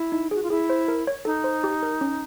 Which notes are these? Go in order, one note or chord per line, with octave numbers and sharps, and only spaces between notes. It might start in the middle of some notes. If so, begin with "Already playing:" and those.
Already playing: E4
D#4
F#4 G#4
F4
E4 G#4
C5
A#4
C#5
D#4 A4
C5
G4
A#4
C#4